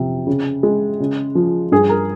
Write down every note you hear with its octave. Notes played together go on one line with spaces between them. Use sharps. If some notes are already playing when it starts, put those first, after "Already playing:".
Already playing: F2 C3
C#3
G#3
C#3
F3
G2 G#4
A#4